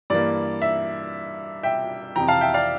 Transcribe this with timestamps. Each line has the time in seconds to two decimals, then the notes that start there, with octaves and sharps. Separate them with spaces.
0.10 G2 E3 A#3 D5
0.62 E5
1.63 E5 G5
2.16 F2 C3 E3 G5 A#5
2.28 F5 A5
2.41 E5 G5
2.54 D5 F5